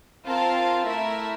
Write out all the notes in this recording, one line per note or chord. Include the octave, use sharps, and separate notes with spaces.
C4 F4 A#4 F5 A5
A3 E4 A#4 E5